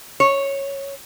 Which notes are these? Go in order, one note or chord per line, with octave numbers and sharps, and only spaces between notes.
C#5